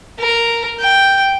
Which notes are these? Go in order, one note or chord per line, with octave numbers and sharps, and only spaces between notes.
A#4
G5